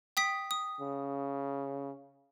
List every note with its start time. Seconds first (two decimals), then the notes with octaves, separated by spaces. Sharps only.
0.17 G5 D#6 B6
0.51 D#6
0.81 C#3